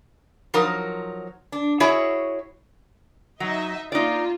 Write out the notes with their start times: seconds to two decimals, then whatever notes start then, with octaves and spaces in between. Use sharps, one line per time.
0.54 F3 F#3 D#4 A#4
1.52 D4
1.80 E4 F#4 G#4 C#5 E5
3.40 F#3 D#4 D#5 E5
3.92 A#3 D#4 F4 D5